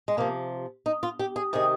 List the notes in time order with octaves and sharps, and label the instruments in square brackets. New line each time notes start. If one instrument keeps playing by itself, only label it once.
[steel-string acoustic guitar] G#3
C3 F3 A#3
D#4
F4
G4
G#4
C3 D#3 G#4